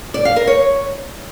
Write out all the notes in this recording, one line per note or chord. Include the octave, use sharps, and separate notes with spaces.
D5
F5
A#4
C#5